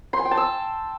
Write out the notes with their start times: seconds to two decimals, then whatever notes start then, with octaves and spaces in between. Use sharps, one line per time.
0.13 C6
0.19 G#5
0.25 G5
0.31 A5
0.37 E6